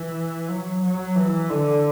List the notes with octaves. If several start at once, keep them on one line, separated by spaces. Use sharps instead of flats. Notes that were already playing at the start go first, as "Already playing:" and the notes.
Already playing: E3
F#3
F#3
E3
D3